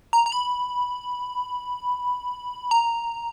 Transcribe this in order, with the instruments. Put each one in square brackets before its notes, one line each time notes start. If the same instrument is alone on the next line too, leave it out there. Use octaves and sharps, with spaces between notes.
[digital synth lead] A#5
A#5
B5
A#5